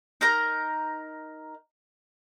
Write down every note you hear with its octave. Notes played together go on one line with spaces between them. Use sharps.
D#4 A#4 A#5